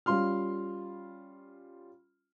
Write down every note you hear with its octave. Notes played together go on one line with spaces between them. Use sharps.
G3 C#4 F4 C6 F6